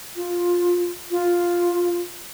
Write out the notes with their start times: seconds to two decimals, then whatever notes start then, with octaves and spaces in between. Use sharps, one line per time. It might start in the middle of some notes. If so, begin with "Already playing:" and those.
0.16 F4
1.11 F4